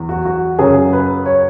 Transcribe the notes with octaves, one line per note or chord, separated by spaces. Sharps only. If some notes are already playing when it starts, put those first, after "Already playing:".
Already playing: E2 E3
F#4
F#4
F#2 C#3 F#3 G#4
B4
C#5